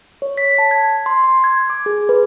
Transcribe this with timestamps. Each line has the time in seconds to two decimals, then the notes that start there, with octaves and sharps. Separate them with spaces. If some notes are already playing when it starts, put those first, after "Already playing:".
0.22 C#5
0.37 B6
0.58 A5
0.71 G#6
1.06 C6
1.24 C6
1.44 G#6
1.70 D6
1.86 G#4
2.09 B4